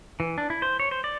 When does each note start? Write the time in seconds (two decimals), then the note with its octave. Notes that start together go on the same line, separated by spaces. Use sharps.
0.20 E3
0.38 D4
0.50 E4
0.62 C5
0.80 C#5
0.91 C5
1.04 D5